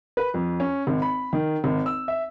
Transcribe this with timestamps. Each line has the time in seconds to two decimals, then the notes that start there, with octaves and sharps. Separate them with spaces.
0.17 B4
0.34 F2
0.60 C#4
0.87 G#1
1.02 B5
1.33 D#3
1.64 G#1
1.86 E6
2.08 E5